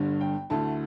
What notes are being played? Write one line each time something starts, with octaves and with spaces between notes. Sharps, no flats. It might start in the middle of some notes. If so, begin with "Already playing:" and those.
Already playing: G1 G2 D3
G5
D2 D3 A3 E4 A5